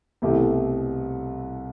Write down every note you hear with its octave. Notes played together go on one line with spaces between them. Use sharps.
C2 B2 A3 E4 G4